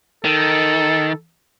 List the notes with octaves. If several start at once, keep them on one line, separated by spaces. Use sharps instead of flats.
D#3 A4